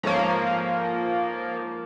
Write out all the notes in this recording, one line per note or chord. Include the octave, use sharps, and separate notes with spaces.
G#2 F3 A#3 A4 C#5